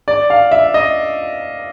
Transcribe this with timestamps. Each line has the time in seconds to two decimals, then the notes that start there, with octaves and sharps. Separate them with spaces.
0.08 D5
0.30 F5
0.52 E5
0.74 D#5